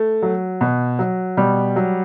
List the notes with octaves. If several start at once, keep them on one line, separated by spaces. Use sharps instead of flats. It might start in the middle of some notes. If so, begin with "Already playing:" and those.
Already playing: A3
F#3
B2
F#3
B2 G3
F#3